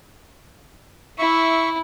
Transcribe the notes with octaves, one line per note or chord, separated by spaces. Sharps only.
E4 E5 C#6